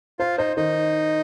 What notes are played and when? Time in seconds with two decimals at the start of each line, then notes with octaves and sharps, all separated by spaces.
0.19 F4 C5
0.38 D#4 C5
0.57 D#3 D#4